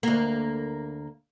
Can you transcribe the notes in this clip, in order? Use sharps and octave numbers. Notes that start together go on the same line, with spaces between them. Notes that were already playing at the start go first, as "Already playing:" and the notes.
D2 A#3